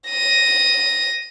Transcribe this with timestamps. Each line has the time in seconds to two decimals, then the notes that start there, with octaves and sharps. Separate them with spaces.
0.11 A#6 D#7